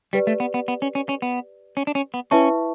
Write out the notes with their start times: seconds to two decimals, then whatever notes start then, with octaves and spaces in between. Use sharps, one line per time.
0.13 G3 G4 B4 D5
0.27 A3
0.40 B3
0.54 B3
0.68 B3
0.82 C#4
0.95 C#4
1.09 C#4
1.22 B3
1.77 C#4
1.87 D4
1.95 C#4
2.14 B3
2.31 C#4 E4 B4 E5 A5 C#6